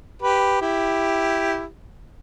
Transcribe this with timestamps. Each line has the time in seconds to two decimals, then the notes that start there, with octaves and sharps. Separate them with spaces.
0.22 G4 B4
0.61 E4 G4